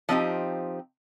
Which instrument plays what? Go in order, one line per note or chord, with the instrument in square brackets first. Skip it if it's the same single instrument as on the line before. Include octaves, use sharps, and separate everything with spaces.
[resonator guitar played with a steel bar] F3 C4 D#4 G4